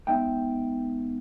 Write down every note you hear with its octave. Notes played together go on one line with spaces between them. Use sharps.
G#3 B3 D#4 E5 G5